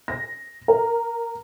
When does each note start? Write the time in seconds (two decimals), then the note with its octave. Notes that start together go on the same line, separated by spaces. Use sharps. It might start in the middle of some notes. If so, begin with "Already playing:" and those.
0.08 A#6
0.68 A#4